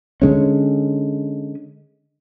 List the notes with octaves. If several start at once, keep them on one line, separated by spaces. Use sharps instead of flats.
D3 G#3 C#4